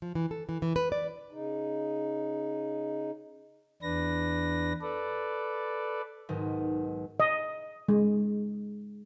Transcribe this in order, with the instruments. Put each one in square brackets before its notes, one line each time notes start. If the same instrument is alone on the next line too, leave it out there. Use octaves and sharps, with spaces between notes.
[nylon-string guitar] F3
E3
A4
E3
E3
B4
D5
[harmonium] C#3 D#4
[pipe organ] E2 D4 B4 A#6
A4 B4 D5
[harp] B1 G#2 D#3
[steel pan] D#5
G#3